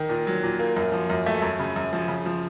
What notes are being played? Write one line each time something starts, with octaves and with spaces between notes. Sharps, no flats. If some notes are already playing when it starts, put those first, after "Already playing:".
Already playing: D#3
A#2
F#3
A#2
A#3
F#2
F3
F#2
A3
F#2
C#3
F#2
F3
C#3
F3